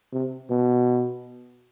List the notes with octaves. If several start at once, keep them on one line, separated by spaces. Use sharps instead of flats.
C3
B2